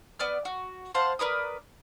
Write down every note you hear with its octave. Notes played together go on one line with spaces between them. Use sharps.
B3 D5 F6
F#4
C5 F5 F#5 A5
A#4 B4 D5 D#6